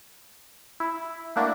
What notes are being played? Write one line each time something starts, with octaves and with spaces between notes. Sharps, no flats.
E4
A3 A#3 D4 E4 F#4